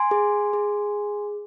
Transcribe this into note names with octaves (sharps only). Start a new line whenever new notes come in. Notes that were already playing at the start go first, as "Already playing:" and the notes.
Already playing: G#5 C6
G#4
G#4